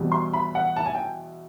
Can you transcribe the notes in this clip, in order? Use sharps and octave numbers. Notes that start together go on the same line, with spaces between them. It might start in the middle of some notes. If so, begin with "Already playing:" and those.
Already playing: E2 B2 G3 C4
C6
B5
F#5
A5
G#5
G5